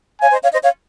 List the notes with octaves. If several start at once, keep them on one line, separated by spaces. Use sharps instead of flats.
C#5 F5 G#5
C5 D#5
C#5 F5
C5 D#5
C#5 F5